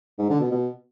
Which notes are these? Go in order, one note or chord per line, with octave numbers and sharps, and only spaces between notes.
G#2
D3
B2
B2